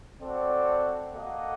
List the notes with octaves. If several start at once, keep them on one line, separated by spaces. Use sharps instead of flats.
C4 F#4 A4 D5 F#5
A#3 F#4 A4 D#5 F#5